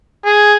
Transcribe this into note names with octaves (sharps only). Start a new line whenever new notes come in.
G#4